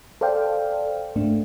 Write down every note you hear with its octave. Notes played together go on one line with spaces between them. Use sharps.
A4 C5 D5 F5 G5
G#2 A3 D4